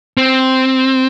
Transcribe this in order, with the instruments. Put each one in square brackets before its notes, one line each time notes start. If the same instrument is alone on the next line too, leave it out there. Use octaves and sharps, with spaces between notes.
[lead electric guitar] C4